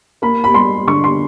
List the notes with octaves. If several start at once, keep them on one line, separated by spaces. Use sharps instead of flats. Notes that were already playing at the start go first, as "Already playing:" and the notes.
A#3 B5
B5
G3 C6
D3 C#6
C6